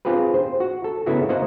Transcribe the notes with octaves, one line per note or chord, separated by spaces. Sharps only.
C4 F4 G4 G#4 B4
C5
F#4
A4
C#3 B3 E4 F#4 A4
A#3 F#4 C5 D#5 F#5